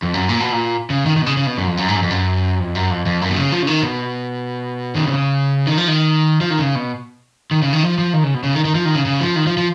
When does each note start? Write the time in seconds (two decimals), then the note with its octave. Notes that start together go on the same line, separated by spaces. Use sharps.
0.02 F2
0.14 F#2
0.29 A#2
0.40 B2
0.52 A#2
0.90 C#3
1.06 D#3
1.17 D#3
1.22 B2
1.26 C#3
1.37 C#3
1.47 B2
1.58 F#2
1.67 F2
1.77 F#2
1.88 G#2
1.96 F#2
2.03 F2
2.10 F#2
2.60 F2
2.75 F#2
2.90 F2
3.06 F2
3.21 F#2
3.30 B2
3.36 C#3
3.52 F3
3.63 C#3
3.67 D#3
3.83 B2
4.95 D#3
5.06 C#3
5.67 D#3
5.77 F3
5.88 D#3
6.41 F3
6.50 D#3
6.59 C#3
6.75 B2
7.51 D#3
7.62 C#3
7.73 D#3
7.83 F3
7.98 F3
8.13 D#3
8.24 C#3
8.34 B2
8.43 C#3
8.54 D#3
8.65 D#3
8.75 F3
8.85 D#3
8.95 C#3
9.06 C#3
9.21 F3
9.36 D#3
9.47 F3
9.57 F3